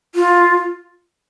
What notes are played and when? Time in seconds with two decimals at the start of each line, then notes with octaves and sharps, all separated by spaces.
0.15 F4